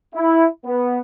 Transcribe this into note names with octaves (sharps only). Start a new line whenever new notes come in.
E4
B3